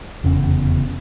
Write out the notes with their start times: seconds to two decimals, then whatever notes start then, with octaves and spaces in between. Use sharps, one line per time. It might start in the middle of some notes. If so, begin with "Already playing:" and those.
0.24 F1 E2 C#3 C#4